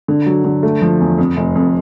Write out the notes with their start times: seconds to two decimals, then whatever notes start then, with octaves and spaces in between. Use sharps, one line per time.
0.08 D3
0.26 F#3
0.45 D3
0.63 A3
0.82 F3
1.00 E2
1.18 F2
1.37 F1
1.55 F2